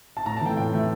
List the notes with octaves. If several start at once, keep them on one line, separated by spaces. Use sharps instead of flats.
A5
A2 A#5
A5
E3 A3 G5
A2 G5
E3 A3